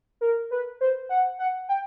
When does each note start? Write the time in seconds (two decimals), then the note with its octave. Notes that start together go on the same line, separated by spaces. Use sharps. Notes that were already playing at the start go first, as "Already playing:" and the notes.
0.21 A#4
0.51 B4
0.81 C5
1.09 F#5
1.39 F#5
1.69 G5